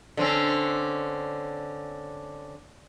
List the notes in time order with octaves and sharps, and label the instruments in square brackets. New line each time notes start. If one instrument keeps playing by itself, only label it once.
[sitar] D3 C4 C#4